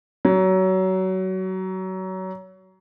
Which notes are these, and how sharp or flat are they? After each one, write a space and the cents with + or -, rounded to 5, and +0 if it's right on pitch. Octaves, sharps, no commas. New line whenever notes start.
F#3 +25